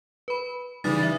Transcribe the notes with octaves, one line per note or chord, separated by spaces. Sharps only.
B4 B5
C#3 E3 G3 D#4 D#6 A6
G3 E5